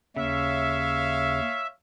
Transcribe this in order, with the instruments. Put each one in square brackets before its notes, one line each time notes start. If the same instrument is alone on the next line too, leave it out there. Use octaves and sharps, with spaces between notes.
[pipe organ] D#2 [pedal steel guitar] C#3 [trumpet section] C#5 F5 [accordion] E5